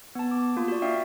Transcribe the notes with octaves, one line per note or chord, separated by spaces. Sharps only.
B3 A5
D6
A#3 F4
F#4 D5
D4 E5 F5 G5